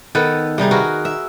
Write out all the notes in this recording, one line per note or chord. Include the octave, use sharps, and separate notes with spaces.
D#3 B3 A4 B4
C3 G3 D#4 G#4
F#4 G#4 A#4 B4
E5